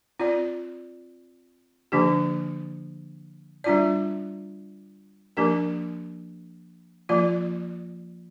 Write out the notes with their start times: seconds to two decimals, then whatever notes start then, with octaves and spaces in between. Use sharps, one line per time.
0.19 C4 F4 D5
1.92 D3 F3 A#3 D4 G4
3.64 G3 D4 F4 D5
5.37 F3 A#3 D4 G4 A#4
7.09 F3 A#3 F4 D5